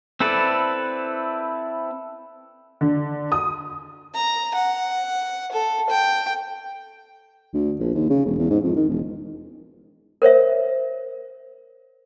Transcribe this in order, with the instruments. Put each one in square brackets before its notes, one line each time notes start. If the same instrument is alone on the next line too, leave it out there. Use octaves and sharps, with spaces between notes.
[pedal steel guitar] C4 E4 A4 B4 D5
[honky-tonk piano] D3
D#6
[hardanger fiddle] A#5
F#5
A4
G5
[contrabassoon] D2
A#1
D#2
C#3
E1
E2
G#2
F2
D#3
E1
[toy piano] A#4 C5 C#5 E5